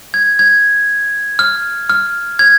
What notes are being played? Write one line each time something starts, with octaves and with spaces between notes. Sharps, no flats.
G#6
G#6
F6
F6
G#6